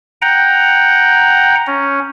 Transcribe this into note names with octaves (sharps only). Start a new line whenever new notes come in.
F#5 G5 A#5
C#4